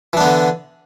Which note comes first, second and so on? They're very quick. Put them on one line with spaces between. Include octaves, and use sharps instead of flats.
E3 D4 B3 D3